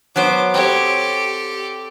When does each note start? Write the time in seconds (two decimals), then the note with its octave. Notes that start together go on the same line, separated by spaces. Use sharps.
0.16 F#3 B3 C5 D6
0.54 C4 G4 A4 C#5